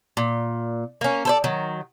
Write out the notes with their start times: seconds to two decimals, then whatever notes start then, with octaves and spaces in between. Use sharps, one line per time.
0.17 A#2
1.01 A#3 C#4
1.25 A4 C5 D5
1.44 D#3 F#3